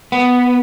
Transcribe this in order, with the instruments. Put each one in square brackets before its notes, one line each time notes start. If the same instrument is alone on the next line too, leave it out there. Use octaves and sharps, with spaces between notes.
[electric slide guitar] B3